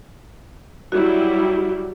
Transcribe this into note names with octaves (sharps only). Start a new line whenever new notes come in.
F#3 G3 E4 F#4